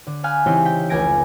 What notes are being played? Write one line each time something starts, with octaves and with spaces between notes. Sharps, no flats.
D3
F5 F#5 G#5 B5 F6
C#3 E3 C4 D#4 G4 G#4
G5 B6
F1 C#2 G#5 G#6 A#6 D7